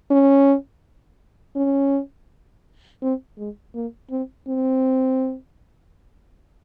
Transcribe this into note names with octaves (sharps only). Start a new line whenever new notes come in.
C#4
C#4
C4
G#3
A#3
C4
C4